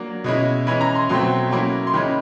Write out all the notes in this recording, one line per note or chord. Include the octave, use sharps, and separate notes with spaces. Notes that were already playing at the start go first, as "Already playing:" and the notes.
Already playing: F#3 A#3 D4
B2 G#3 C#4 E4
E3 G#3 C#4 E4 B5
A#5
C6
B2 F#3 A3 C4 C6
F#3 A#3 C#4 E4
C6
D#3 G#3 C#4 E4 B5